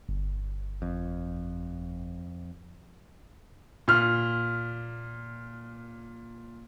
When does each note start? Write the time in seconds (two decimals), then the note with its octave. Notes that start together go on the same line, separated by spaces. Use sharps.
0.09 G1
0.82 F2
3.88 A#2 F6